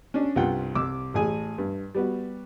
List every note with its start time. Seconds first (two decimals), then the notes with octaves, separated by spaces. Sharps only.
0.14 C#4 D4
0.36 C2 G2 F4 F#5 G5
0.75 C2 D6 E6
1.14 A1 A2 G#4 G#5
1.58 G2
1.95 G3 B3 F#4